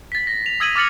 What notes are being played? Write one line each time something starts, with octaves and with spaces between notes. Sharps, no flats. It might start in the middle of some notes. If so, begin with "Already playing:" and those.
A6 B6
A#6
F7
D#6 E6 G#6 B6 D#7 F#7
D6 F6 A6 C#7 F#7